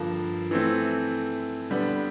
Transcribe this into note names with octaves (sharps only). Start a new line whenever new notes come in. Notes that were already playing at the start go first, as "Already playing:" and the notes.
Already playing: G2 D3 F3 A#3
E3 A3 C4
D3 G3 B3